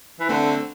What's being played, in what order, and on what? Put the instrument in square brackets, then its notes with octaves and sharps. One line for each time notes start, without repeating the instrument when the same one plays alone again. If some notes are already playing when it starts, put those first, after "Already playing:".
[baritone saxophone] E3
[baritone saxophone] D3 [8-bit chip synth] A3 C4